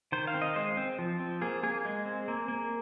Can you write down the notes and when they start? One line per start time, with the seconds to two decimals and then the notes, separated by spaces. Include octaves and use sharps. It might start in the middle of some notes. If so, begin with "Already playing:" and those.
0.12 D#3 C5
0.27 F5
0.34 C4
0.42 D#5
0.56 G#3 C5
0.77 C4
0.99 F3
1.20 C4
1.42 A#3 G#4
1.63 A#3 G#4
1.85 G#3
2.06 C4
2.28 A#3
2.48 A#3